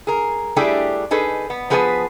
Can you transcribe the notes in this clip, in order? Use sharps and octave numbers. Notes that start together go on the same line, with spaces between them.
G#4 A#4
G3 A3 D4 E4 G4 G#4
D#4 G#4 A4 B4
B3
F3 B3 G#4 B4 D5 A5